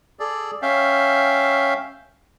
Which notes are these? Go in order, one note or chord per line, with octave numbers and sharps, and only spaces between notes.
G#4 A4 D5
C#4 E5 F5 G5